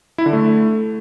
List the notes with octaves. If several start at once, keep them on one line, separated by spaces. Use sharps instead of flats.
E4
D3
A3